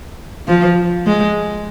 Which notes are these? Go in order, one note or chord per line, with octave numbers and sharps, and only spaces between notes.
F3
G#3